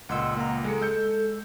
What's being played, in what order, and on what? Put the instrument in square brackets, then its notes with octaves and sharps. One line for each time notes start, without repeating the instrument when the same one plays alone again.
[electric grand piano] C#2 A#2 [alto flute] D#5 [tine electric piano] F#5 C6 E6
[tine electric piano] A#3 A#5 [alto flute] F#5
[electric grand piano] G#3 C#7 [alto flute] A4
[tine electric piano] G#3 [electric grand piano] E6 G6 C#7